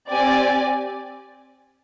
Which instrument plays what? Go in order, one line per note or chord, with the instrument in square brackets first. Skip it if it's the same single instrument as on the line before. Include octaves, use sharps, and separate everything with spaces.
[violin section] C4 G4 D5 G#5